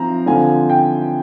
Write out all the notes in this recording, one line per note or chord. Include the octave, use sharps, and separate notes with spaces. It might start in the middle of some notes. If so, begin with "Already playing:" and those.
Already playing: F3 C4 A#5
D3 F3 C4 F4 G#5
G5